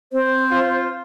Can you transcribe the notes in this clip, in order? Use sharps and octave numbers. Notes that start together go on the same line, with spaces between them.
C4 C5
F4